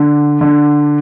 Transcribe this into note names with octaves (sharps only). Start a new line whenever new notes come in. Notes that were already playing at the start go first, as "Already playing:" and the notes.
Already playing: D3
D3